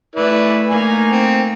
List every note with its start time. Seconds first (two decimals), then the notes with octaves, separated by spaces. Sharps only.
0.16 A3 E4 B4 D5
0.68 A3 A#3 D#4 G#5
1.12 C4